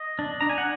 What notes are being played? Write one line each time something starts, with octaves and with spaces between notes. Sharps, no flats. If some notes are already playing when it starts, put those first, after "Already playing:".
Already playing: D#5
D4
D4 A#5
G#5
F#5